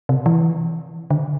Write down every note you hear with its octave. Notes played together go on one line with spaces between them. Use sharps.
C3
E3
D3